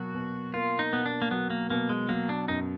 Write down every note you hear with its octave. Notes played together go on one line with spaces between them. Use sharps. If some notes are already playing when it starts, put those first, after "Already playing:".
Already playing: B2 F#3 A#3 F#4
B2
A#3 F4
D#4
B2 B3
D4
A#3
F#3 B3
A#3
B2 A#3
G#3
F#3 A#3
D4
F#2 D#4